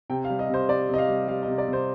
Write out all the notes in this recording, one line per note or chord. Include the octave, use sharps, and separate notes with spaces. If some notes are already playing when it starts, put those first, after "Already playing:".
C3 G5
F5
G3
D#5
C3 C5
G3 D5
C3 D#5
F5
G3
G3 F5
D#5
C3
D5
C3
C5